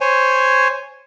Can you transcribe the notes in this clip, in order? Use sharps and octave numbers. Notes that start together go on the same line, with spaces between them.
C5 C#5 G#5